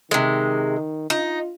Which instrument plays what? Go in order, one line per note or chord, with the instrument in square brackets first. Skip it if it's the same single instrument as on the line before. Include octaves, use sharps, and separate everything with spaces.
[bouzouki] C3 G#3 [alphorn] D#3
[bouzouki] D#4 [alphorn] F4